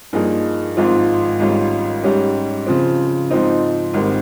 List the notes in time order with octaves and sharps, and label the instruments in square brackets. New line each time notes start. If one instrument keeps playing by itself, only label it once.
[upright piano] G2 F3 A#3 D#4 G#4
G#1 G#2 F3 C4 F4
G#1 G#2 G3 C#4 F4
G#2 G3 C#4 G4
C#3 F3 C4
G#2 F3 C4 D#4
G#1 G#2 D#3 G3 C4